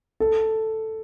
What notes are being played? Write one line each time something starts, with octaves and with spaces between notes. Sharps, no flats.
A4